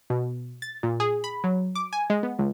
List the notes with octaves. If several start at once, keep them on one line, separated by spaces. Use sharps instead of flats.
B2
A6
A#2
G#4
B5
F#3
D6
G#5
G#3
B3
C#2